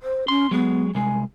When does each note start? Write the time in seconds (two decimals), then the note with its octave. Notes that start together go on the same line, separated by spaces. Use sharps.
0.02 C5
0.28 C#4 C6
0.51 F#3 G#3 B3
0.95 C2 G#3 G#5